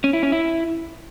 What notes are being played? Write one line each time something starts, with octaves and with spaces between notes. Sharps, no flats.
C#4
E4
C#4
E4